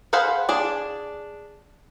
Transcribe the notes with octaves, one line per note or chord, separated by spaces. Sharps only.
G#4 B4 C5 F5 F#5
D4 G#4 D5